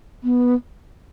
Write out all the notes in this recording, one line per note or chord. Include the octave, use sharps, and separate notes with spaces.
B3